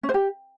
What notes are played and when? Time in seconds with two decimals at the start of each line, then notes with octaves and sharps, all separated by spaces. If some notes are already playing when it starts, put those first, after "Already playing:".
0.03 C#4
0.09 C5
0.14 G4